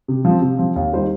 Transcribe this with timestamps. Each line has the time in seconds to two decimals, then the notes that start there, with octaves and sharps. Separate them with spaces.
0.08 C3
0.25 F3 C4
0.42 C3
0.58 F3 C4
0.76 D#2
0.93 D#3 G3 D#4 C5